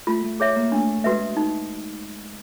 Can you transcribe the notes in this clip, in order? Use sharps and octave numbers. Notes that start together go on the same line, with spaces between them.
A3 F4
A3
G#4 C#5 E5
A#3
A3 D4
G#3 F#4 B4 E5
D#4